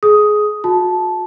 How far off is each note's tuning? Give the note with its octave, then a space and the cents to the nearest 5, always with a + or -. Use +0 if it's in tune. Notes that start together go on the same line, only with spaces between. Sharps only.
G#4 +20 D#6 +5
F#4 -40 A5 -10